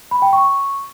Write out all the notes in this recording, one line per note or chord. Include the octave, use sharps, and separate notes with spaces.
B5
G5
C#6